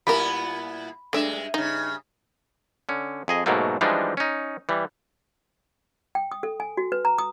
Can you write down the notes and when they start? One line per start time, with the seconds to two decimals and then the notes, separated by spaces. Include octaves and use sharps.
0.07 A#2 G3 B3 E4 A#4 B5
1.13 G2 G#3 A3 D4 E5
1.54 G2 C#3 D#4
2.89 D3 C#4
3.28 F2 G#4 D#5
3.46 G#2 B2 F#3 A3 A#3
3.81 E3 F3 G3 G#3 D4 D#4
4.17 C#4 D#4
4.69 E3 G3
6.15 G5
6.32 D#6
6.43 A4
6.60 G#5
6.77 F#4
6.92 B4
7.05 A#5
7.18 D#6